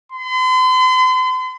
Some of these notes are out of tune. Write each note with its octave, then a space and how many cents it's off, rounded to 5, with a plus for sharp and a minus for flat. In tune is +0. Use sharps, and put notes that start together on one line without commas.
C6 -40